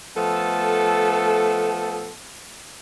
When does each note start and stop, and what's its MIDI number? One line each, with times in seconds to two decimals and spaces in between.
0.16 2.13 53
0.16 2.13 57
0.16 2.13 59
0.16 2.13 69